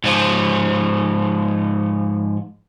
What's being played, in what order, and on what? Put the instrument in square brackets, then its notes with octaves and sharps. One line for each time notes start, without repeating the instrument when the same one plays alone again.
[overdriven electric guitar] G#2 F3